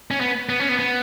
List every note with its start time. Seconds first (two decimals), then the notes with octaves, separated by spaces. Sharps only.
0.11 C#4
0.21 B3
0.49 B3
0.60 C#4
0.69 B3
0.79 B3